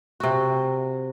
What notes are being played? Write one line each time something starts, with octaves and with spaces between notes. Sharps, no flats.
C3 F#4